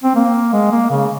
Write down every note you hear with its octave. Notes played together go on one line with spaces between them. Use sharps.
C4
A#3
G#3
A#3
C#3